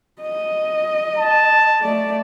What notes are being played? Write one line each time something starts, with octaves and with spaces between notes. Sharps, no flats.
D#5
A5
A3 D5